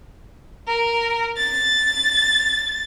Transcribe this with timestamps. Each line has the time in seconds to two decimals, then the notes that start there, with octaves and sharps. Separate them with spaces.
0.68 A#4
1.37 A6